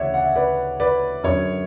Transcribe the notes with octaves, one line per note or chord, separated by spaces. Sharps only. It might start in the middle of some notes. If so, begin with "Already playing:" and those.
Already playing: D2 C#3 E3 C#5 D5 E5 F#5
F#5
E5
B4 D5
B4 D5
F#2 D3 C#5